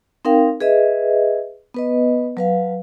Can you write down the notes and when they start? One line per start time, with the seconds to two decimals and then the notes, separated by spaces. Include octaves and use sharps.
0.25 C4 D#4 A#4 F5 G5
0.60 G#4 B4 D#5 E5
1.74 B3 B4 D#5
2.37 F#3 B4 F5